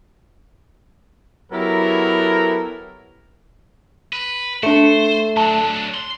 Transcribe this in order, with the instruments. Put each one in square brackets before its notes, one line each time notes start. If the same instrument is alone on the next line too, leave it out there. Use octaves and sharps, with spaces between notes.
[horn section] F#3 B3 E4 G4 A4 A#4
[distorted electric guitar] B4
[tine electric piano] A3 [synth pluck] D4 C#7 [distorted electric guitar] C5
[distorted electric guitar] F#3 D4 [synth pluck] A5
[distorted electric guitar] C6